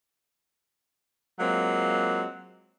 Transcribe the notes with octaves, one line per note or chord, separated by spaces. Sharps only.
F#3 G#3 A#3 C4 F4